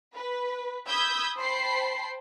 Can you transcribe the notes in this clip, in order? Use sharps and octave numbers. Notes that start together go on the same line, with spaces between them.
B4
B5 D#6 E6 G6 G#6 B6
C5 G5 A5 B5 C7